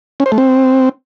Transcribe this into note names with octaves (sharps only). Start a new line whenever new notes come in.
C#4
C5
A3
C4